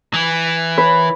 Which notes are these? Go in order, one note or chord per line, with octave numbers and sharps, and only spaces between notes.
E3
B4